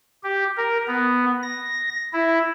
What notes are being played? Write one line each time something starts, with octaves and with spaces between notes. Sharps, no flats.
G4
A#4
B3
A#6
E4